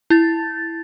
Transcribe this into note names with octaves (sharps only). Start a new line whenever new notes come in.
E4 A6